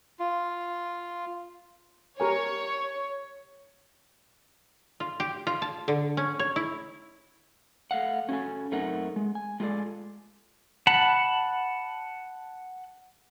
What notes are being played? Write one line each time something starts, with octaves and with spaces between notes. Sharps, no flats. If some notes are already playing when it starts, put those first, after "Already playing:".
F4
G4 A#4 C#5 G#5
F4
G4
F4
A5
D3
C#4
C#5
E4
A3 F5 F#5
C#4 F#4 A4 G#5
F#2 A3 C4 D#4 A#4 F#5
G#3
G#5
G#3 F4 G#4 A4 D5
F#5 A5 B5